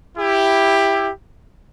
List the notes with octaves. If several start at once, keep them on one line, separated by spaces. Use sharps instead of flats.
E4 G4